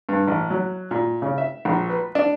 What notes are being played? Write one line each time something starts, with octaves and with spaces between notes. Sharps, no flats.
G2
A1
F#3
A#2
C#3
E5
A#1
B4
D4